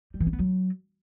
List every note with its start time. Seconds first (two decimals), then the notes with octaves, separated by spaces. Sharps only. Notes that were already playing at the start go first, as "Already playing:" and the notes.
0.14 G3
0.20 E3
0.27 C4
0.33 B3
0.39 F#3